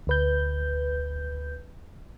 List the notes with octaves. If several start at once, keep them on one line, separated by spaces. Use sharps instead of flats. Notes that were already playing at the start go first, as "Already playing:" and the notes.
D2 B4 G6